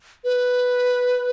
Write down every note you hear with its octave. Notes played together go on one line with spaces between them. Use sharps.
B4